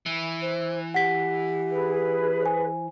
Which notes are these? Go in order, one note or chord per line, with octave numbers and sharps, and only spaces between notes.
E3
C5
G4 F#5 B6
G#4 B4
C5 G#5